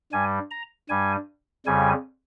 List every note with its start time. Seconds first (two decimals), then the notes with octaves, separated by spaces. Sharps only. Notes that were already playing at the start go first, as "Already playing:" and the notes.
0.12 G2 G3 G#5
0.51 A#5
0.89 G2 G3 G#5
1.66 F2 C#3 G3 G#5